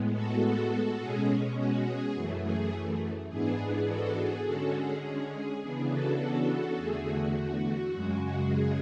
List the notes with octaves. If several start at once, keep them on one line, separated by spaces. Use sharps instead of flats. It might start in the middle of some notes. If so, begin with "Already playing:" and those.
Already playing: A2 G#3 B3
F#4 A4
B2 G#3 C#4 G#4
F#4
G#4
F#2 E3 A3
G#4
G#2 E3 B3 D4 G#4
F#4 A4
G#4
D3 G#3 C#4 F#4 A4
G#4
G#4
G#4
C#3 E3 B3 D4 G#4
F#4 A4
F#4 A4
E2 D3 A3 G#4
F#4
F#4
F#2 C#3 G#3
F#4
G#4